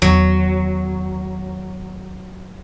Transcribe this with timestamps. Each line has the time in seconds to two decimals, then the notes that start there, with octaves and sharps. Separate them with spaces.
0.02 E2 D#3 F#3